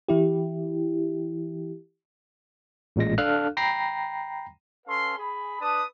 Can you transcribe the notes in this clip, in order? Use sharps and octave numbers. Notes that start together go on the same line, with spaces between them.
E3 E4 G4
A1 A#2 G#3 A#6
D4 A4 F5 F6 F#6
G5 A#5 B5 A#6 C7
C#4 A4 B4 F5 C6
G#4 B5
D4 B4 A5 D#6